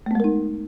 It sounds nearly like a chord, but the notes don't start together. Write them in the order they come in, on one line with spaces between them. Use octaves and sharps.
A3 B3 G#3 A#4 D#4